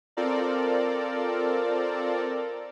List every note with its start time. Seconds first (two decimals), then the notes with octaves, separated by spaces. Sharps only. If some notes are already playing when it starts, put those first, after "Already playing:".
0.17 C4 F4 A4 A#4 D5